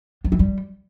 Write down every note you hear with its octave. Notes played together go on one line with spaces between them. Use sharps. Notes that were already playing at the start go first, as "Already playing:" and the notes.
F#3
E3
G3